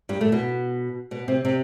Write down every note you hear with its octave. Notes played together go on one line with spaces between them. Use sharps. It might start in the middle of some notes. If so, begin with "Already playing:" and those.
G2 G3
A2 A3
B2 B3
B2 B3
C3 C4
C3 C4